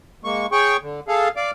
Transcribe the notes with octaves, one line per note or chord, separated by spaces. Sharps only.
G#3 A#3 C#6
G#4 C#5 G5 C#6
D3
G#4 A4 F5
D5 F5 D6